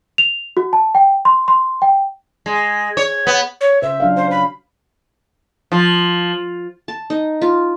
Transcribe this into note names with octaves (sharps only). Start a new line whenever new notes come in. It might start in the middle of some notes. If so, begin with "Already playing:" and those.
F7
F#4
A5
G5
C6
C6
G5
G#3
C#5
B3
C#5
C#3 C5 E5
F#3 D4 F5
C5
B5
F3
A5
D#4
F4